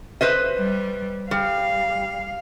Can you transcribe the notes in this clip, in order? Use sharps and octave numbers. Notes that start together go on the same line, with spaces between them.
B4 C5 D#5
G3
G3 F5